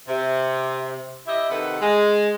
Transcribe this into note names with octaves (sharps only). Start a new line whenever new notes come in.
C3
E4 G4 D#5 E5
C3 D#3 A4 B4 F#5
G#3